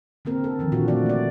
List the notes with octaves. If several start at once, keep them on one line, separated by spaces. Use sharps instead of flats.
D3 A#3 C4 A#4
A4
D3 D#3 F3
A#2 D4 F4 F#4
E3 A3 C4 F#4 D5
A#3 D5